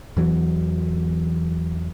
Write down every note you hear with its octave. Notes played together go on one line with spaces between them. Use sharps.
E2 E3 F#3